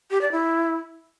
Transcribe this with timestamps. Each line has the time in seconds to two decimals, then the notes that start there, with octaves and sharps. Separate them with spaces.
0.11 G4
0.21 D5
0.32 E4